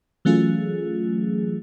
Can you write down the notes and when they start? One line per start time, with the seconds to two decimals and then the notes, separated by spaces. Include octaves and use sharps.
0.25 E3 F#3 A3 C#4 F4 G#4